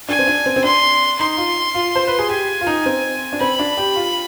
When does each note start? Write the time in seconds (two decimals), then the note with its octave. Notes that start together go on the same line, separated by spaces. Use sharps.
0.08 D4 G#5
0.19 C4
0.27 D4
0.46 C4
0.56 C4
0.64 D4 C6
1.19 D#4 C6
1.37 F4
1.74 F4
1.95 C5
2.07 B4
2.19 G#4
2.29 G4 G#5
2.61 F4
2.67 D#4
2.86 C4
3.33 D4
3.40 C4 B5
3.59 D4
3.77 G4
3.96 F4